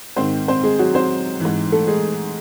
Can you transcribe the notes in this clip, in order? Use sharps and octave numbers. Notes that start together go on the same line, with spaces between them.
G#2 D#3 C4 C5
C4 C5
G#3 G#4
F#3 F#4
C4 C5
G#2 E3
A3 A4
G#3 G#4